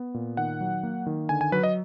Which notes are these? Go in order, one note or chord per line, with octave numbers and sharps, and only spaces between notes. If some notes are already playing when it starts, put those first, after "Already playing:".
Already playing: B3
A#2
D#3 F#5
F#3
A#3
D#3
D3 G#5
G#5
F#3 B4
D#5